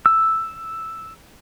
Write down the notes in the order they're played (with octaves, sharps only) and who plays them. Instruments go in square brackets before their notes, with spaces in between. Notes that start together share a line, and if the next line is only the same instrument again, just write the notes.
[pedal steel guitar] E6